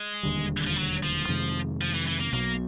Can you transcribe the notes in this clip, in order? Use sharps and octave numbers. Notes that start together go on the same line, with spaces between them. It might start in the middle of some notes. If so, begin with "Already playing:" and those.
Already playing: G#3
E1 D#2 D3 G3
F3
F#3
F3
F2 C3 D#3 G#3
F3
E3
E3
A#3
B1 B2 F#3 A#3